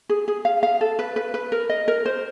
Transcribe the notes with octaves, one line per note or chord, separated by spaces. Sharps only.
G#4
G#4
F5
F5
A4
B4
B4
B4
A#4
D#5
A#4
C5